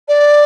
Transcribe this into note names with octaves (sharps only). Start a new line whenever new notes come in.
D5